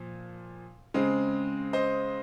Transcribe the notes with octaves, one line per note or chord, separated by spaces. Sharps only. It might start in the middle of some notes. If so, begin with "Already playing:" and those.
Already playing: A#2 F3
C#3 G#3 C4
C5 D#5